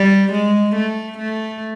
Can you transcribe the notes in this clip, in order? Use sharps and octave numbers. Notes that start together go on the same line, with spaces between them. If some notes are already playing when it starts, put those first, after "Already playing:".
Already playing: G3
G#3
A3
A3